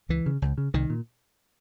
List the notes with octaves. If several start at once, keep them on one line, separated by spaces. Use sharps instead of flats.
C#2 E3
C#3
C#2
C#3
C2 D#3
A#2